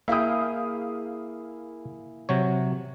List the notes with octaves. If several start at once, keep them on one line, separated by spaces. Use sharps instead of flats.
A#3 E4 G#4 E5 F5 G5 D#6
C3 F#3 C#5